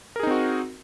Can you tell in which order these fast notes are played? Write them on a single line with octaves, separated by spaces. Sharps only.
A#4 G#4 D#4 C4 F#4